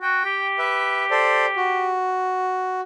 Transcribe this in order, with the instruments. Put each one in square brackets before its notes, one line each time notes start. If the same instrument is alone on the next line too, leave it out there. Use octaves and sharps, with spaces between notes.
[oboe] F#4 [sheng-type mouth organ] G5
[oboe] G4
[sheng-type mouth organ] B4 E5
A4 C5 D5
F#4